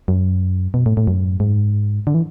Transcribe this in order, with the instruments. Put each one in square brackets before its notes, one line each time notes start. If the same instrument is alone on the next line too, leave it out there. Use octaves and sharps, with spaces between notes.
[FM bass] F#2
B2
A2
A2
F#2
G#2
D3
E3